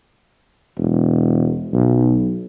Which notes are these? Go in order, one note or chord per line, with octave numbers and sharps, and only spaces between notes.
E1
B1